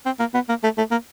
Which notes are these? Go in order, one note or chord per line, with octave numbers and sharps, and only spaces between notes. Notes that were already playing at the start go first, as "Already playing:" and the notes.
C4
A#3
B3
A#3
A3
A3
A#3